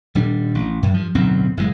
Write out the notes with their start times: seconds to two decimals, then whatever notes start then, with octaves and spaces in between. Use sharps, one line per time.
0.15 D#1 G3 D4
0.55 A1
0.82 F#2
0.94 G2 F3
1.15 D1 B1 F#2 C4
1.57 F#1 A2 D3 G#3